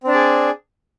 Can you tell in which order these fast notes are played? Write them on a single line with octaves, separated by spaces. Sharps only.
C4 D4 D5 G#4